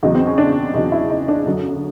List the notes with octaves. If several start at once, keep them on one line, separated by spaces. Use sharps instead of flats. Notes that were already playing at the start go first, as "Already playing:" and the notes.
E2 C#3 F#3 D#4
C4
C#4
D4
E2 C#3 F#3 D#4
E4
D#4
D4
F#2 D3 F#3